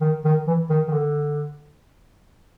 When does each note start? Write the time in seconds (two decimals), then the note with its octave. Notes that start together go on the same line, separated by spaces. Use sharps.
0.01 D#3
0.25 D#3
0.47 E3
0.70 D#3
0.88 D#3
0.93 D3